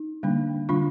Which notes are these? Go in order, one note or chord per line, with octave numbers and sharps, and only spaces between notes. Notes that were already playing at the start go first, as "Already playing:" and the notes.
Already playing: D#4
D3 G3 A#3 D4
D3 G3 D4 F4